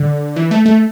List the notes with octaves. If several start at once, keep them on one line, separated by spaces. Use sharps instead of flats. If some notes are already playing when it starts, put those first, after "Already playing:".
Already playing: D3
E3
A3
A3